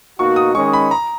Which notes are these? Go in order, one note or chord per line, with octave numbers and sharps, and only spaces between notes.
B2 A#3 D#4 F#4 C#6
D#6
D#3 G#3 C#4 C#6
B5
A#5